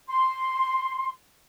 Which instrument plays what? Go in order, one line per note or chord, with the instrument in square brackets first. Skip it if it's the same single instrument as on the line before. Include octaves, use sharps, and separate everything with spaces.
[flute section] C6